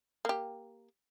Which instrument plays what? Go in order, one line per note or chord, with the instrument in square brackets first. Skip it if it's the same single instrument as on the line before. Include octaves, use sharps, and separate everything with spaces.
[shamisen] A#3 G4